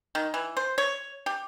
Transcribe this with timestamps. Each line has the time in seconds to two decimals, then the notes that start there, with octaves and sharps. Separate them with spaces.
0.15 D#3
0.34 E3
0.57 C5
0.78 C#5
1.26 G4